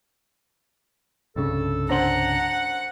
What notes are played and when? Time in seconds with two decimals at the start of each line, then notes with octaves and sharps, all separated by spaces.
1.36 C2 G2 C#3 A4
1.90 D4 C5 F#5 A#5 F#7